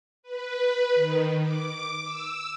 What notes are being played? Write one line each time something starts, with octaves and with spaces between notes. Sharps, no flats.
B4
D#3
D6
E6